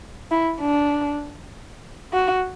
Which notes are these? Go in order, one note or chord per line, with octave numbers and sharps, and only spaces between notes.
E4
D4
F#4